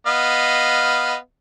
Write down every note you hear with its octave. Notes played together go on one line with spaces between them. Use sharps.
B3 D#5 F5